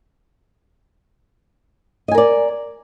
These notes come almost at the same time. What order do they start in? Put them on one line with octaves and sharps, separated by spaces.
D#5 G#5 A#4 D5